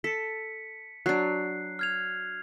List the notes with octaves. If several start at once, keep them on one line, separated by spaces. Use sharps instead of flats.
A4 B6 C#7
F#3 D4 F#6 C7
F6 G#6 F7